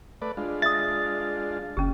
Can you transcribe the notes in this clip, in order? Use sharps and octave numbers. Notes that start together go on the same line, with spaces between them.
A3 B4 D5
G#3 D4 F4
E5 D#6 A6
F#1 C#4 G4